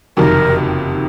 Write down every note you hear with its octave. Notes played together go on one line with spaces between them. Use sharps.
F#1 F2 C3 D#3 F#3 A#4